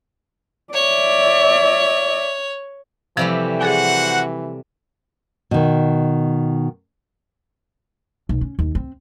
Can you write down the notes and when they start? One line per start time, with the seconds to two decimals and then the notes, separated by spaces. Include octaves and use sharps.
0.73 C#5 D5 E5
3.17 C3 E3 F3 G3 A3
3.61 F#4 G#4 A4 C5 F#5 G#5
5.51 B2 D#3
8.29 B1
8.41 C#4
8.59 D#2
8.75 C4